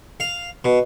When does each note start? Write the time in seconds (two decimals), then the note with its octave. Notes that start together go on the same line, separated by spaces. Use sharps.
0.20 F5
0.65 B2